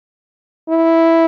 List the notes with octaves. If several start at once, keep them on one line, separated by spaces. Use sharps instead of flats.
E4